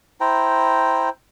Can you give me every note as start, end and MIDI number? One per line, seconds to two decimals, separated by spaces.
0.21 1.09 64
0.21 1.09 72
0.21 1.09 79
0.21 1.09 82